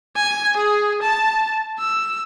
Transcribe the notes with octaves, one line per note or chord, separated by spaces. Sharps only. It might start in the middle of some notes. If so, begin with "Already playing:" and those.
G#5
G#4
A5
E6